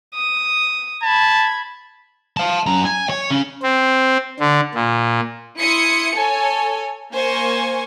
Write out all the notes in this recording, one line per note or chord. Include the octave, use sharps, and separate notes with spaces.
D#6
A5 B5 G#6
F5 A5
F#2 A#5
G#5
C#5
C#3 C#4
C4
D3
A#2
E4 C6 D#6 C#7
A4 C#5 G#5
A#3 C5 G#5 C#6